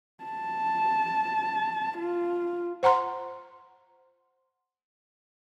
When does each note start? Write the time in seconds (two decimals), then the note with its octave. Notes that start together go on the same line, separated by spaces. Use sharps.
0.24 A5
1.98 F4
2.83 C5 F#5 A#5 C6